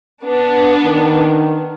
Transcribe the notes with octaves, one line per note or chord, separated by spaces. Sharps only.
B3 D4
D#3